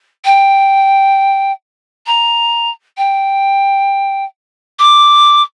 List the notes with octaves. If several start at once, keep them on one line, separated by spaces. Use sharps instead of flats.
G5
A#5
G5
D6